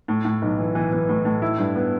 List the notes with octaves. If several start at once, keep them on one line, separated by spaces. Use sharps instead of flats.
A2
A2
B1
E3
E3
E3
A2
A2
E4
G2
B3